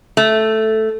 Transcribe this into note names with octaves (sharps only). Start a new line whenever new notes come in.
A3